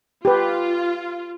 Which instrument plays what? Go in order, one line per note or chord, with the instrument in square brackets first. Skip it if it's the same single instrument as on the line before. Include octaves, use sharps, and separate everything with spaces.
[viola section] F4 [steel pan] G4 B4